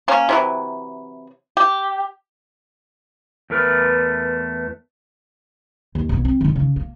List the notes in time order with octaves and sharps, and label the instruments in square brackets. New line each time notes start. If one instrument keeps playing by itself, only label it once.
[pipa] A#3 C#4
C3 E3 F#3
G4
[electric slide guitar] E2 A3 A#4 B4
[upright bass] D#2
B1 B3
C4
D3 D#3
C#3
A#3